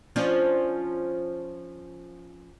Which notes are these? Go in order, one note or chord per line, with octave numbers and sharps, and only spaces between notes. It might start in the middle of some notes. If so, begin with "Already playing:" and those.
F3 C#4 D4